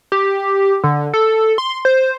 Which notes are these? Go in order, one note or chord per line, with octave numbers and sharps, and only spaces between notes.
G4
D3
A4
C6
C5